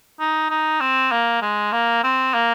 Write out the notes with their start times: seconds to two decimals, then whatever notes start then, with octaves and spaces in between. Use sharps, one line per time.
0.20 D#4
0.50 D#4
0.81 C4
1.12 A#3
1.42 G#3
1.73 A#3
2.03 C4
2.34 A#3